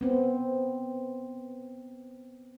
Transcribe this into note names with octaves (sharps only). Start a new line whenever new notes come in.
B3 C4